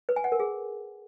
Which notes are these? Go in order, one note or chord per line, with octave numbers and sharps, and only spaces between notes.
B4
G#5
F#5
A#4
G#4